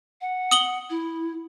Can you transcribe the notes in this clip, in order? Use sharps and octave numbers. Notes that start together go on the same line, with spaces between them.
F#5
D#6 F#7 G7
E4